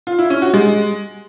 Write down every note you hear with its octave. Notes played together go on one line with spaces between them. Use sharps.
F4
E4
C#4
F#4
G#3